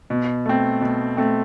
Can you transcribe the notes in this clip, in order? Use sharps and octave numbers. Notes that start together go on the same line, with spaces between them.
B2
A3 C4
B2
A3 C4